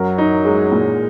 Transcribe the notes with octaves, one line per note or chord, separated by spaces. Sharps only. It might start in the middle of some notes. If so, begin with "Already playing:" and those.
Already playing: F#2 F#3 A#4
D#4
G#3
A#2